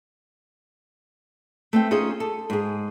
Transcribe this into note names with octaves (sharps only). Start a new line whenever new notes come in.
A3 C4 G5
C#4 D#4 F4 G#4 C5 D#5
A4
G#2 G#4